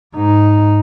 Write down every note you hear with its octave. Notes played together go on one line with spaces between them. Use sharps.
G#2 D#4